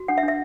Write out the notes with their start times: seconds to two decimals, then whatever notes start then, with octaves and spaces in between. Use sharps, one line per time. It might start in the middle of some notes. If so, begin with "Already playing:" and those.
Already playing: F#4
0.08 D4 F#5
0.18 E5
0.23 D4
0.28 E5